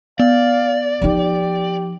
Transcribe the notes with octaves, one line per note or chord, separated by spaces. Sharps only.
B3 D5 F5
F3 D#4 G4